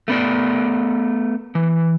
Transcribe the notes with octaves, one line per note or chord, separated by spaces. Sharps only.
A3 B3 D5
E3